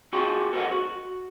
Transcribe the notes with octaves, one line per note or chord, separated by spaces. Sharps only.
F4 F#4 G#4 A4 G5 C6
A4 A#4 C5 C#5 D#5 F#5
F#4